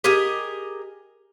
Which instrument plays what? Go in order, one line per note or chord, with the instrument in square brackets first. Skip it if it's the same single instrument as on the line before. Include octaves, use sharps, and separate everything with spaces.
[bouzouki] G4 G#4 A#4 D#5